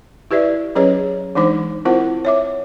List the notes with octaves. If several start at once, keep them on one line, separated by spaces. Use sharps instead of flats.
E4 G4 B4 D5 E5
F#3 C#4 G#4 B4 C#5 D#5
E3 G#3 D4 D#4 C5 D6
C4 E4 F4 A#4 C5 F#5
C#5 E5 D6